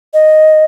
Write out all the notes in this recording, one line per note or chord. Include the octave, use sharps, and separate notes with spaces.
D#5